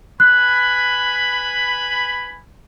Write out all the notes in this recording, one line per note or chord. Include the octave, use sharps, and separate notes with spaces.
B4 G#5 B5 F#6